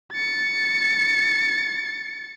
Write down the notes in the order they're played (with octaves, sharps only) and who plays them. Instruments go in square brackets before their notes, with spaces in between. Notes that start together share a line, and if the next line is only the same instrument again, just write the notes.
[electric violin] A6 C#7